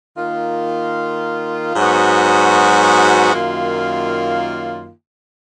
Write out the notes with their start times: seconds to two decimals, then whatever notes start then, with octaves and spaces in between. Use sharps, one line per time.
0.17 D#3 A#3 F4
1.75 G#2 F#3 B3 F#4
3.33 F#2 D#3 A#3 F4